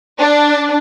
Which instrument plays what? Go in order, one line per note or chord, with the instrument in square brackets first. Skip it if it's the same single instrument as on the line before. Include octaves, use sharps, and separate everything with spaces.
[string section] D4